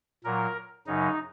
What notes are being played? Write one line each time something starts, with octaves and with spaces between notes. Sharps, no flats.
A#2 F#3 A#4
F#2 C#3 F#3 D#4